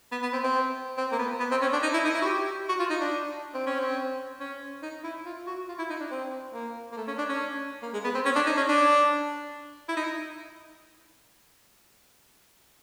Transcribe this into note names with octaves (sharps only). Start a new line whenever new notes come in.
B3
B3
C4
C4
C4
A#3
B3
B3
C4
C#4
D4
D#4
E4
D#4
E4
F#4
G4
F#4
F4
D#4
D4
C4
C#4
C4
C#4
D#4
E4
F4
F#4
F4
E4
D#4
D4
C4
A#3
A#3
A3
C#4
D4
C#4
A#3
G#3
B3
C4
C#4
D4
D#4
C#4
D4
E4
D#4